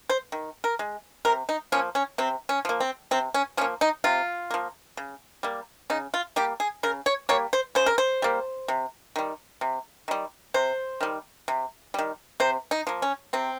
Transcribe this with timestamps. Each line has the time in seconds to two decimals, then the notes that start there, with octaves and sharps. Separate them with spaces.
0.09 C5
0.32 D#3
0.64 A#4
0.79 G#3
1.25 C3 A#4
1.49 D#4
1.72 F3 A#3 C#4
1.95 C#4
2.18 C3 C4
2.49 C#4
2.65 F3 A#3
2.80 C4
3.11 C3 C4
3.34 C#4
3.57 F3 C#4
3.61 A#3
3.81 D#4
4.04 C3 F4
4.51 F3 A#3
4.97 C#3
5.43 G3 A#3
5.90 C#3 D#4
6.14 F4
6.36 G3 A#3 G4
6.60 G#4
6.83 C#3 A#4
7.06 C#5
7.29 G3 A#3 C#5
7.53 C5
7.75 C#3 C5
7.86 A#4
7.98 C5
8.22 G3 A#3
8.68 C3
9.16 D#3 G3
9.61 C3
10.08 D#3 G3
10.54 C3 C5
11.01 D#3 G3
11.48 C3
11.94 D#3 G3
12.40 C3 C5
12.71 D#4
12.87 F3 A#3
13.02 C#4
13.33 C3 C4